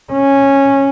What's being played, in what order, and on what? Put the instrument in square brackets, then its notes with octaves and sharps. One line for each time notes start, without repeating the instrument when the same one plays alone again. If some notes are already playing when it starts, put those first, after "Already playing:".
[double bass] C#4